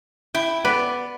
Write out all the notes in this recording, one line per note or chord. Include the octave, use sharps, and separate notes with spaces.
E4 G5
B3 B4 D5